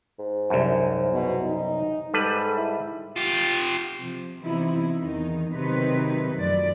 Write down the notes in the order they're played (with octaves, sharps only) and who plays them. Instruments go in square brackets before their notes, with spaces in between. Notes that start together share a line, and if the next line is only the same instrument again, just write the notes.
[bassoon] G#2
[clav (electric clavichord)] C2 F#2
[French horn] B2
D#4
[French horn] G#2 [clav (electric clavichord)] G3 B4 [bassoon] A4
[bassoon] E4
[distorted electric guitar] F4 G4
[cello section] C3 F3
C3 E3 B3 D#4 E4
E2 D#3 D#4
C3 D#3 F#3 D#4 B4
F#2 F3 A3 D5